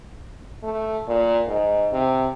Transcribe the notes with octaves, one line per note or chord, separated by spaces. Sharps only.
A3
A#2
G#2
C3